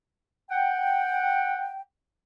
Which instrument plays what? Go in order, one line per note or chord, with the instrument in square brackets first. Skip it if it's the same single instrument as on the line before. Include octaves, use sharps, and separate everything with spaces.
[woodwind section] F#5 G5